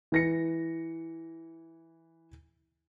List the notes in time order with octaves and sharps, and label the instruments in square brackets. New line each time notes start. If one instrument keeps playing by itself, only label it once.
[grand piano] E3 A#6 C#7